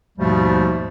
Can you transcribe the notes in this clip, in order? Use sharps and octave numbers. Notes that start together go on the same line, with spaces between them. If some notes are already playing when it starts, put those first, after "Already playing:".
D#2 G#2 B2 F3 G3 A3